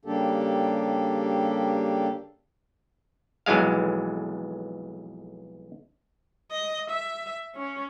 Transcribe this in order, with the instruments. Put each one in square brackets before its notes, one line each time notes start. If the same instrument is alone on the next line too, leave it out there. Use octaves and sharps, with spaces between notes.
[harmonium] C#3 G3 A#3 D4 G4 A4
[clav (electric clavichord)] B1 F2 E3 F#3 G#3 F5
[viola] D#5
E5
C#4